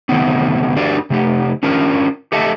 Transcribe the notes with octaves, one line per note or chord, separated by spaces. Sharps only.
C3 D#3 F#3 A3 B3 C4
D4 F#4 G4 A#4 D5
C3 A3 G4
C#4 D4 F4 A#4
G4 A4 D#5 E5 A5